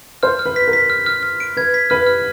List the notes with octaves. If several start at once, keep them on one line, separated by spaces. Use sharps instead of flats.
C5 F6
F6
B4
B6
A#4
B6
F6
F6
F6
D7
B4 G#6
B6
B4 F6
F6